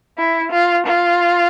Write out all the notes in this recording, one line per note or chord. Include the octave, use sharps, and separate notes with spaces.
E4
F4
F4